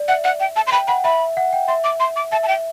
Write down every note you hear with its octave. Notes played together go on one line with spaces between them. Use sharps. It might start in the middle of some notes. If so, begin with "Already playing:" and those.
Already playing: D5
E5 F#5
F#5
G5
A5
C6
G5 B5
F#5 B5
E5 B5
F#5
G5
E5 C6
D6
C6
D6
E5 A5
A5
G5